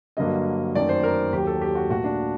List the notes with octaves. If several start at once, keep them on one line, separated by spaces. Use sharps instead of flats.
G2 D3 F#3 A#3 D#5
F#2 D#3 A3 D5
C5
A#4
D#2 D#3 F#3 G4
A4
G4
F#4
A#2 A3 F#4
D4